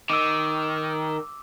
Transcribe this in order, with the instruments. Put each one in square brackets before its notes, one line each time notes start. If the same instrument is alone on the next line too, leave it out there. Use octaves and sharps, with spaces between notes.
[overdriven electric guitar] D#3 [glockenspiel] D6 E6